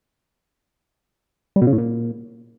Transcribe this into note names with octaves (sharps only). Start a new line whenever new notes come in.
G3
B2
C#3
A2
A#2